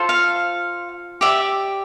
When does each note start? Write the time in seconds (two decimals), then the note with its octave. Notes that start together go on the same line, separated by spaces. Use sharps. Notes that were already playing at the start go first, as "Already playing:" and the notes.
Already playing: F4 A4 C5
0.09 F5
1.21 G4 D5 E5